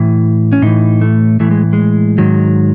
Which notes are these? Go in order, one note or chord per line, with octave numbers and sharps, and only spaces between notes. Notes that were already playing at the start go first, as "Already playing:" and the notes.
Already playing: A2 E3
C#4
A2 E3 D#4
A3
A2 E3 A3
G#3
G#3
G#2 D#3 F#3